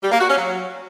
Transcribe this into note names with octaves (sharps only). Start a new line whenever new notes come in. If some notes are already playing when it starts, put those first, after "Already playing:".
G3
A#3
F#4
C#4
F#3